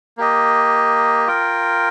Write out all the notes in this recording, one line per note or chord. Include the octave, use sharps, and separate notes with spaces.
A#3 G4 D#5
F4 A#4 G5